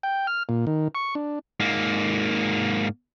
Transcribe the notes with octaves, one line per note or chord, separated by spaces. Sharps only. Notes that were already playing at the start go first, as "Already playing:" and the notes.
G5
F6
A#2
D#3
C#6
D4
G#2 A#3